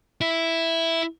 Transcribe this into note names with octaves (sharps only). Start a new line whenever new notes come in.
E4